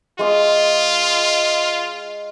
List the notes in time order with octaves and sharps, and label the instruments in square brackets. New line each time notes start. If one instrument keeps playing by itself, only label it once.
[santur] G#3 D#6 [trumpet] F4